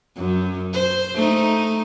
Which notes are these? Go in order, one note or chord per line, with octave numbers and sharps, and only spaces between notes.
F#2
C5
A3 D#4